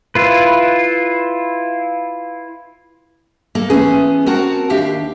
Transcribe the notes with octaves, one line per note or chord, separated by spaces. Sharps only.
E4 F4 B4
A#3 A4
E3 A3 B3 C#4 G#4
C4 F#4 A#4 F#5 A5
D#2 D4 G4 E5 F5